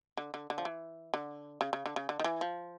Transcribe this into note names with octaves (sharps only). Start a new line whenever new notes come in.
D3
D3
D3
F3
E3
D3
C#3
C#3
D3
C#3
D3
D#3
E3
F3